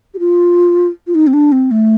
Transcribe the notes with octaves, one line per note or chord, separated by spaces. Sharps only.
G4
F4
F4
D#4
C4
D4
C4
A3